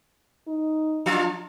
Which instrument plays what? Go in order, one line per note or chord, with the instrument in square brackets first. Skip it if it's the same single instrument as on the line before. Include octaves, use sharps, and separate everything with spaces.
[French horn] D#4
[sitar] F3 F4 [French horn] D4